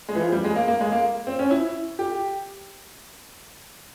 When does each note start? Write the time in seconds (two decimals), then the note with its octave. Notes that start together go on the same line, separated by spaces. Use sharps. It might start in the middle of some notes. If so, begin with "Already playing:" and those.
0.09 G#3
0.15 E3
0.20 F3
0.32 G3
0.44 G#3
0.56 A#3
0.68 A#3
0.81 G#3
0.92 A#3
1.27 C4
1.39 C#4
1.51 E4
1.99 G4